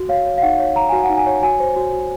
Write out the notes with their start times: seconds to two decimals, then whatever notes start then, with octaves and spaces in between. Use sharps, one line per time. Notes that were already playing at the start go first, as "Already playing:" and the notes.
Already playing: F#4
0.09 C#5 F5
0.26 C#5
0.38 F5
0.42 D#4 F#5
0.59 C#5
0.75 C#5 A#5
0.89 F#4 G#5
1.04 F#5
1.09 D#4
1.17 G#5
1.26 C#5
1.43 F#4 G#5
1.60 C5
1.76 F#4
1.93 F#4